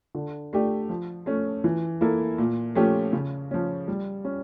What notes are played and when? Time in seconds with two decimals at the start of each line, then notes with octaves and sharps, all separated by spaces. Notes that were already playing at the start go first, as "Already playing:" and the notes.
0.15 D3
0.53 A3 D4 G4
0.89 F3
1.26 A3 C#4
1.64 E3
2.01 A#3 E4 A4
2.38 A#2
2.75 F3 A3 C#4 G4
3.13 C#3
3.51 F3 C#4
3.88 G3
4.25 C#4